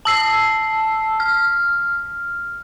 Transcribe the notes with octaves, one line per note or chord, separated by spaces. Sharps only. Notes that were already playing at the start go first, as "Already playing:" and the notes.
A5 E6 C7
F6